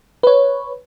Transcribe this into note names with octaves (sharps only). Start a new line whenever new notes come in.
B4 C#5